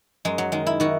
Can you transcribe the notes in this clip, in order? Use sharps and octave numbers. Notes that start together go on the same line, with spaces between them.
F#2 G#3
F#3
D#3 G#3
E4
D#3 F#4